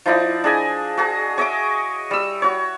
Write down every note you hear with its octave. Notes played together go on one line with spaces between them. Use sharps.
F3 D#4 E4 D5
D4 G#4 D#5 G#5
F#4 G#4 A#5
C#5 D#5 E5 D6
G3 E6
F#4 C#5